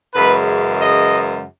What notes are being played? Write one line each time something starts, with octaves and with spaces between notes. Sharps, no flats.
F#2 C#3 E3 G#3 B4
D#5